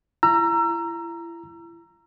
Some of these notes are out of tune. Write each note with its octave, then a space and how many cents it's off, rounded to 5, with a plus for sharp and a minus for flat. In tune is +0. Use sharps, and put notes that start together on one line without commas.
E4 +35 A#5 +0 E6 +35